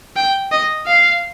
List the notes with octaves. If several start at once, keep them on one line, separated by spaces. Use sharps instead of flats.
G5
D#5
F5